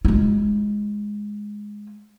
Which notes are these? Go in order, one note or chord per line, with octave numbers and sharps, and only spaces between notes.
G#3 F4